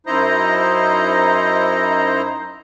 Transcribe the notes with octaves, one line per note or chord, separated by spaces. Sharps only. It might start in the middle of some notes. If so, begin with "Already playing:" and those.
F#2 D#4 E4 C5 D#5 A#5